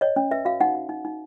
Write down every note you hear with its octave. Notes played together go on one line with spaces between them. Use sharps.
C#5 D#5
C#4
B4 E5
F#4 F5
D#4 F#5
D#4
D#4
D#4